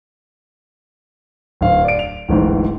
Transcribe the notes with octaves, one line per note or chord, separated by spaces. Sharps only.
D1 F5
D5 D7
F7
D1 A1 G#2